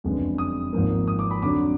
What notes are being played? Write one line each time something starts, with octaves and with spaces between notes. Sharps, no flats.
F#1 F2 D3 G#3 B3
D#6
G#1 G#2 F3 A#3
D#6
D6
B5
F2 D3 F#3 D6